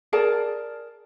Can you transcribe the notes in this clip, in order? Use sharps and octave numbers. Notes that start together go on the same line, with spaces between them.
G#4 A#4 D5 A5